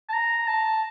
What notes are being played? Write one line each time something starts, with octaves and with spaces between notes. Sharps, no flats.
A5
A#5
A5